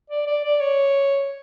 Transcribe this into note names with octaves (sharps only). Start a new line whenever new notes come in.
D5
D5
D5
C#5